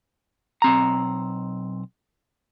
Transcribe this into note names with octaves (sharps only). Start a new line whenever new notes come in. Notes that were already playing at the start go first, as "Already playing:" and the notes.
B1 C4 A#5